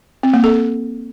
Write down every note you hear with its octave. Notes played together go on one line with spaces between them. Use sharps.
C4
A#3
A4